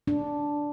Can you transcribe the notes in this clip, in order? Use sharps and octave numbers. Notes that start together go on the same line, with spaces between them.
D4